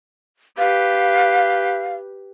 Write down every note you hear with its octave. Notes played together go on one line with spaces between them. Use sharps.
G4 B4 F5